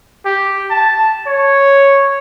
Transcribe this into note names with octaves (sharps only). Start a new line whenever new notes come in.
G4
A5
C#5